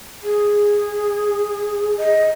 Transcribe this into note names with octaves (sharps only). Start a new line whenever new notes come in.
G#4
D#5